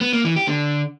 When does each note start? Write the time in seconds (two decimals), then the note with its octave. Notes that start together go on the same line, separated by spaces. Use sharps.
0.01 B3
0.13 A#3
0.25 E3
0.36 G4
0.48 D3